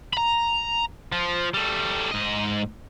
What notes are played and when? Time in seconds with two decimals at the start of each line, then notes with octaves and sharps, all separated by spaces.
0.13 A#5 B5
1.12 F3
1.54 G3 A3
2.11 G#2 D#5